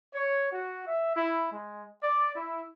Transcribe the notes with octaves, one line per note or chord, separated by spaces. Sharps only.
C#5
F#4
E5
E4
G#3
D5
E4